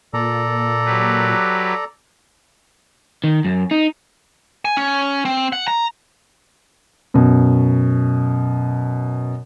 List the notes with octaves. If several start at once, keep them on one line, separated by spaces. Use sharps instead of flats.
A#2 A4 D5 A#5
F#3 G4 B4
D#3
F#2
D#4
G#5
C#4
C4
F#5
A#5
F#2 B2